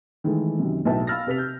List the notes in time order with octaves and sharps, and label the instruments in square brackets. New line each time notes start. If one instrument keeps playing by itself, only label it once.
[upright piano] D#3 E3 G#3 A3
F#2 C3 D#3
B1 A2 B4 E5 G5 A5
F5 B5 E6 F6 A6 A#6
C3 B4 B6 F7
G6